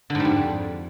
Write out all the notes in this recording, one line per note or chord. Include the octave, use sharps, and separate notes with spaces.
D3
G#2
G3
F2